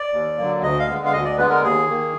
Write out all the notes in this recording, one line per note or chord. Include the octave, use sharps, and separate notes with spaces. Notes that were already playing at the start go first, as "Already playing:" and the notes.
Already playing: D5
D#2
D3 F#3 A#3
D2 D#5
F5
D3 G#3 B3
F5
D2 D#5
D5
D3 G#3 B3 B4
A#4
D#2 G#4
D#3 A#3